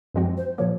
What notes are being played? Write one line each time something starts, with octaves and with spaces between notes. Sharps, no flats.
F#2 F3 G#3 C4 F#4
C5
A#2 F3 A#3 C#5